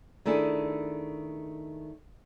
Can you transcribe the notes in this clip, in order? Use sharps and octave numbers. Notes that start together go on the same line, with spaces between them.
D#3 A3 D4 E4 G#4